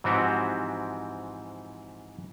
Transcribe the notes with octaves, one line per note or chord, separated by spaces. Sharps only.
G#2 E3 F3 C4 F#4 G4